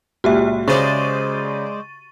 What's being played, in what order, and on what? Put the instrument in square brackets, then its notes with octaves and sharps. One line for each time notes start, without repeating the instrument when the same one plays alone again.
[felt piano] C#2 A#2 [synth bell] F#4 G4 E5
[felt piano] C#3 [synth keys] G#3 C5 D5 [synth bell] C#6 A6 D#7